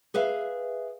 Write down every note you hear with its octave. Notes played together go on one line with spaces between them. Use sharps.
G#4 B4 E5 F5